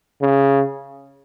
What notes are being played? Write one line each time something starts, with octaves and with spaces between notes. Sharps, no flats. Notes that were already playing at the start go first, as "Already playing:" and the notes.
C#3